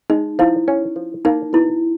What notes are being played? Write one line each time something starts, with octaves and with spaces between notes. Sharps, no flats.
G#3 D#4
F3 E4
C#4
F3
A#3 D#4
B2 E4